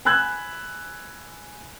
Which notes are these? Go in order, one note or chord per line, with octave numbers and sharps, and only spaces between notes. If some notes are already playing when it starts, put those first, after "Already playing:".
G#5 B5 E6 F#6 G#6